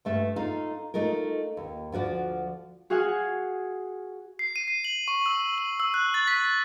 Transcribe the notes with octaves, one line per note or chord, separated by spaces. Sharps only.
G2 A3 E5
D#4 F4 A4 F5
A3 D#4 F4 A#4
D#2
D2 F3 F#4 D5
F#4 G#4 F5 F#5 G#5
C7
D#7
C7
F#7
C#6
E6
F#7
E6
F#6
A6
B6